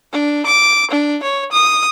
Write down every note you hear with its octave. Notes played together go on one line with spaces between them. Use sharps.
D4
D6
D4
C#5
D#6